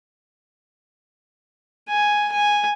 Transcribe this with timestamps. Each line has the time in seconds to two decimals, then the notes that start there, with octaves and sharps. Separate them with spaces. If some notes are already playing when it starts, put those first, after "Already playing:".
1.89 G#5
2.32 G#5